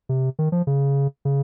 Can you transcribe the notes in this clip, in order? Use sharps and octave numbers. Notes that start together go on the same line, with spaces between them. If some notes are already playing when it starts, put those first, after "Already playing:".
C3
D#3
F3
C#3
C#3